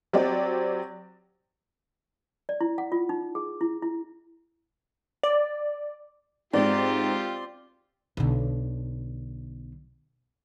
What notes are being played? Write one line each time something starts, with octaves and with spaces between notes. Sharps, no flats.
F#3 C4 G4 D5
D5
E4
F#5
F4
D#4
G#4
E4
E4
D5
G#2 C4 F4 G4 D5 C6
B1 D3